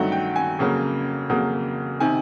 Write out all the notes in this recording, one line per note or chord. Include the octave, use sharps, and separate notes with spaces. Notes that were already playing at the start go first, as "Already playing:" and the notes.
Already playing: G2 D#3 F#3 A3 F#5
G5
G#5
F2 C#3 F#3 A#3
F2 C#3 F#3 A#3
C3 D#3 G#5